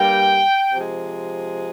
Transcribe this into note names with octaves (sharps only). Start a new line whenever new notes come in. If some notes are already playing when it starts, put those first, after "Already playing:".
Already playing: G2 G3 A#3 G5
C3 F3 G#3